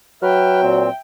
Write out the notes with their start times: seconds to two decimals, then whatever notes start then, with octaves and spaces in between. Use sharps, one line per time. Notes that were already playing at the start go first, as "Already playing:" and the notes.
0.23 F#3 B4 E5 G5 F6
0.62 A#2 C4